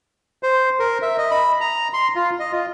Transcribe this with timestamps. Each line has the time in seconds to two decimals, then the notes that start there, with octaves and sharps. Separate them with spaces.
0.43 C5
0.80 A#4
1.02 E5
1.18 D#5
1.31 B5
1.61 A#5
1.93 C6
2.16 F4
2.40 D#5
2.52 F4